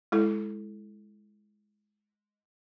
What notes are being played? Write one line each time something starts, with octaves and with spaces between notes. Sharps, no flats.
G#3 E4 A4